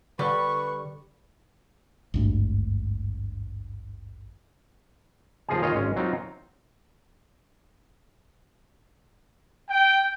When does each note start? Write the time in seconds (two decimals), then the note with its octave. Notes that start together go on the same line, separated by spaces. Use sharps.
0.19 D3 G3 B4 C#6
2.14 G#1 D2 G2
5.49 D#2 F3 F4 G#4 D#5 G#5
5.62 D#3 F4 C#5 D#5
5.75 G#1 G#3 C#4
5.96 F#3 C4 D#4 F4
9.69 G5